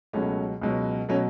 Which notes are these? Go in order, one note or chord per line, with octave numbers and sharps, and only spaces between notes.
C#2 B2 F#3 A3 C#4
C#2 B2 F#3
B2 F#3 A3 C#4